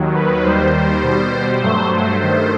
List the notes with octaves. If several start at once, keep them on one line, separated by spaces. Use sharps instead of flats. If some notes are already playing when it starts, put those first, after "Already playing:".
Already playing: D#2 D#3 F#3
B4
D#2 D#3 G3 C5
C5
B2 G3
G2 F#3 A3 C5
C5
G2 D#3 A3 C5